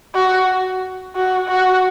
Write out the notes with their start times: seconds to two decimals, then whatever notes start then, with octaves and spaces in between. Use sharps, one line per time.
0.15 F#4
1.16 F#4
1.48 F#4